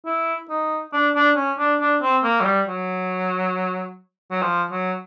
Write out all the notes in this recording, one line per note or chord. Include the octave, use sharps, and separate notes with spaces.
E4
D#4
D4
D4
C#4
D4
D4
C4
A#3
F#3
G3
F#3
F#3
F3
F#3